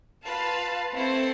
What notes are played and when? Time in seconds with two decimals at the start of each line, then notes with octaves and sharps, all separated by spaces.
0.25 F4 B4 F5 A5
0.92 A3 C4 E4 A4 C5